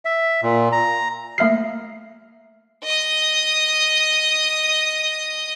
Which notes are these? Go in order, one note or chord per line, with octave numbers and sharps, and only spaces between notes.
E5
A#2
A#5
A3 A#3 E5 F6 C7
D#5 D#6